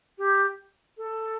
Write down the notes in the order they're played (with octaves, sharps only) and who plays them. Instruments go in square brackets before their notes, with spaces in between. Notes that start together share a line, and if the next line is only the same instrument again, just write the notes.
[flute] G4
A4